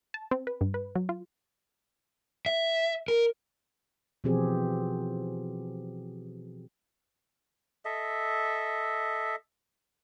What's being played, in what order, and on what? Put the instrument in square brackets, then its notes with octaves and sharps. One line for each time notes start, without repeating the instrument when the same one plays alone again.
[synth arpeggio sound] A5
C4
B4
G2
B4
F#3
F4
[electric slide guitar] E5
A#4
[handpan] B2 E3 F3 C4 G4 G#4
[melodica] A4 D#5 E5